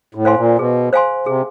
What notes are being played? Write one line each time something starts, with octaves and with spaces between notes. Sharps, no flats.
A2
C5 F5 G#5 C6
A#2
B2 G#4
C5 F5 G#5 C6
C3 G#4